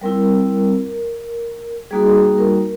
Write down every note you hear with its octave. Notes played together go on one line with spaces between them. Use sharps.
G3 C4 E4 A#4
G3 A#3 D#4 F#4 G#4
A#4